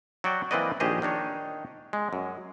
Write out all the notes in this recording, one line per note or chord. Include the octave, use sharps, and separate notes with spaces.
F#3 F#4 D5 G5
E3 A#3 C4 B4 D5 D#5
A#1 D#3 G4 G#4 C5 D#5
D#3 D4 D#4 C#5
G#3
F#2